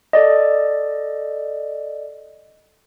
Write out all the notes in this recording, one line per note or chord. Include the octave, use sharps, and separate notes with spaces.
A4 D5 D#5